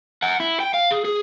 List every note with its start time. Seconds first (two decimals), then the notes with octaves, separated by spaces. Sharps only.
0.22 F#5 G#5
0.40 E4
0.60 G5
0.74 F5
0.91 G#4
1.05 G#4